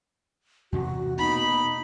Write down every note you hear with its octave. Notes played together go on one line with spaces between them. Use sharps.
E2 C3 F#4
B2 A#3 D#4 B5